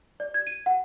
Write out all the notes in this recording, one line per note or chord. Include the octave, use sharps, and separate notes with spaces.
D5
G#6
D#7
F#5